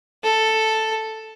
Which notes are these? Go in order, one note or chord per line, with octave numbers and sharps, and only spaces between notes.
A4